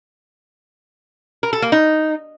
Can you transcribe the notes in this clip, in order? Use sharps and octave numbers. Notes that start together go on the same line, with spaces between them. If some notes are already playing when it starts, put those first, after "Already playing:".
A#4
A4
A#3
D#4